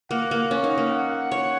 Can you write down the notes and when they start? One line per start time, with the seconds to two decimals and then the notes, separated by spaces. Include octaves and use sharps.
0.10 A#3 F#5
0.31 A#3
0.51 C#4
0.64 D#4
0.78 A#3
0.91 F#5
1.32 C#5